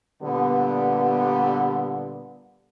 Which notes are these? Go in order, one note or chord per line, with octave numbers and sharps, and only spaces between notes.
A#2 D3 G3 B3